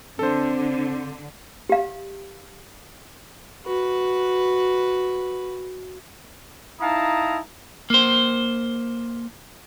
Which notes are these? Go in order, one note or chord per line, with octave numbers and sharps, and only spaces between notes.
D3 C4 A4 C5
G4 F5
F#4 B4
D#4 E4 F5 A5 A#5 D#6
A#3 C5